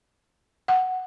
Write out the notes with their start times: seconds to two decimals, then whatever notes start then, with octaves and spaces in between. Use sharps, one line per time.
0.68 F#5